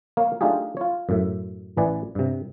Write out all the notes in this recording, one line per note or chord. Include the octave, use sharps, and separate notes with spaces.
A#3 C#5 F5
A3 D4 D#4 F4 G4 G#4
F4 C#5
F#2 A2 E5
A1 E3 B4 D5 G#5
G2 C3